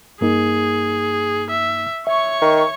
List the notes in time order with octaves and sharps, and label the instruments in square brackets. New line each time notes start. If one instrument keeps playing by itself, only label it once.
[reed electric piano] G2 A#3 D#4 [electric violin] G#4
[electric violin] E5
[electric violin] C#5 C#6 [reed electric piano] E5
[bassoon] D#3